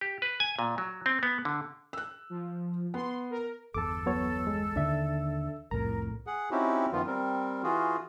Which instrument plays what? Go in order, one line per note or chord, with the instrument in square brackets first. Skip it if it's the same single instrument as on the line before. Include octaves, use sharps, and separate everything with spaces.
[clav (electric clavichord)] G4
B4
G#5
A#2
F#3
C4
B3
D3
[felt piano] E6 F#6
[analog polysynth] F3
[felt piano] B3 [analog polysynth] C6
[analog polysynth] A#4
[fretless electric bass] G1 E2 [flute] A4 [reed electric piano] A5 D6
[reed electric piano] F#3 B3 C#5
G#3
[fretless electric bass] D#2 D3 D#3 [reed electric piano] D4 E5
[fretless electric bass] C2 F2 A2 [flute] A#4 [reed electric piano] A#5
[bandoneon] G#4 F#5
C4 C#4 D#4 E4 F#4 G4
F#2 D#3 F3 B3 F4
G3 C4 A#4
E3 F4 F#4 G#4